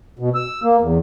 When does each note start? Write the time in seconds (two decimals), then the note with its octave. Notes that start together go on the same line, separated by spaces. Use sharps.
0.19 B2
0.35 E6
0.63 A#3
0.81 E2